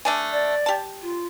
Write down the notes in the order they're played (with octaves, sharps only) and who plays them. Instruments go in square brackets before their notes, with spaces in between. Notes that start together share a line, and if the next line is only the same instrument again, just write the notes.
[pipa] A3 D4 G#5
[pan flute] D5
[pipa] G4 A5
[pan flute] F4